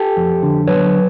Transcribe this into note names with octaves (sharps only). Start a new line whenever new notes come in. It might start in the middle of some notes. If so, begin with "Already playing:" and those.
Already playing: G4 A4
F2
D3
F#3 B4 C#5